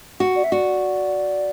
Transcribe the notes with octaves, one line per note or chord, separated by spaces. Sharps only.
F#4
D5
E5
F#4 D5